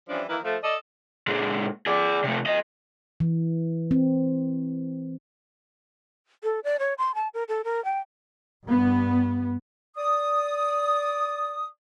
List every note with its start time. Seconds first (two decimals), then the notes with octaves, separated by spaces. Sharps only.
0.09 E3 F3 G3 C#4 D4
0.29 D#3 E3 A#3 E4 B4
0.44 F3 A3
0.64 A4 D5 D#5
1.27 A#2 G#3
1.86 G#4 D5
2.24 C3 A3
2.46 A4 D#5
3.20 E3
3.91 C4
6.44 A4
6.64 D5
6.79 C#5
6.98 C6
7.15 A5
7.34 A#4
7.49 A4
7.64 A#4
7.85 G5
8.64 G2 B3
9.98 D5 D#6